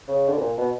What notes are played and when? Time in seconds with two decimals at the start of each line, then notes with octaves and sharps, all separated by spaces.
0.08 C#3
0.29 D3
0.38 A#2
0.58 B2